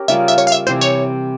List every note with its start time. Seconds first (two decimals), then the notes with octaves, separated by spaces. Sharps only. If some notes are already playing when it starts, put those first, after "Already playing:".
Already playing: C#4 G4 A#4
0.08 C#3 G3 A#3 F4 E5
0.28 E5
0.38 C#5
0.47 F5
0.52 E5
0.66 C3 E3 G3 C4 C5
0.81 C#5